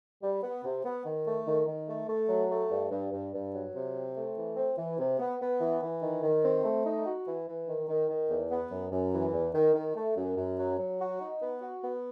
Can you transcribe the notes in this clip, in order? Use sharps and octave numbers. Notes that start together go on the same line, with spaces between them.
G3
B3
C3
B3
D#3
A3
D#3
D#3
A3
A3
F#3
A3
G2
G2
G2
G2
F#3
C3
C4
A3
E3
C4
E3
C3
B3
B3
E3
E3
D#3
D#3
C4
A3
D#4
F#4
E3
E3
D#3
D#3
D#3
E2
B3
F#2
F#2
E3
E2
D#3
D#3
A3
F#2
F#2
F#3
F#3
F#4
D#4
B3
F#4
B3